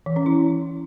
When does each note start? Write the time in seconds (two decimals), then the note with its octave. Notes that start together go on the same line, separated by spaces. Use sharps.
0.06 E3
0.16 C#4
0.26 E4